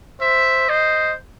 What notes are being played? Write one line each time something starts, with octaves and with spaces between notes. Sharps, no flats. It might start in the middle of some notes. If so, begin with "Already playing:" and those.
C5 E5
C5 D#5